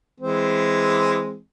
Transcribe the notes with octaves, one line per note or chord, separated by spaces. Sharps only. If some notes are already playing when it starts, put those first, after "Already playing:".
E3 G#3 C4